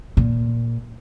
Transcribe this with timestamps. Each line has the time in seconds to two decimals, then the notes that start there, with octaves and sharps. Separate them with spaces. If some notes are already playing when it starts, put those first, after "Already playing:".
0.17 A#2